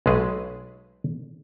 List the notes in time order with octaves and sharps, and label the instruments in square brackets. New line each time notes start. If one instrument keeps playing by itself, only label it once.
[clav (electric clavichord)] B1 G#3 A3 G#4 B4